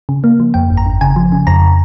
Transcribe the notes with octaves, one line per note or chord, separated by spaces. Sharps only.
C#3
A#3
F3
F2 G5
G1
A#5
G1
C#3 G#5
F3
C#3
F2 A#5